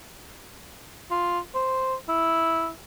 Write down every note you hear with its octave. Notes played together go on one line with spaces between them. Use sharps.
F4
C5
E4